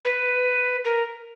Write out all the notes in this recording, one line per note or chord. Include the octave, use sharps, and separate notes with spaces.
B4
A#4